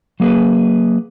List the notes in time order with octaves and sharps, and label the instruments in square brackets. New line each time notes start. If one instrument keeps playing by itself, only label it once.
[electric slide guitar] F#3 A#3 G#4 B4